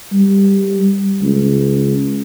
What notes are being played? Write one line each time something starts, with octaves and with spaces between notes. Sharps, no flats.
G3
C#2